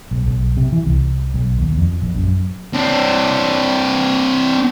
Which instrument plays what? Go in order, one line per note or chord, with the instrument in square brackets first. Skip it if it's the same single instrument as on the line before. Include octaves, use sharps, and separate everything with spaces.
[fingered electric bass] B1
B1
C3
E3
C2
B1
D#2
F2
A#1
F#2
[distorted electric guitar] C4 D4